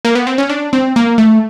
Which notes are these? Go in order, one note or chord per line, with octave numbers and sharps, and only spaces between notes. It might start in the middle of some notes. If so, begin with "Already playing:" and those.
A#3
B3
C4
C#4
D4
C4
A#3
A3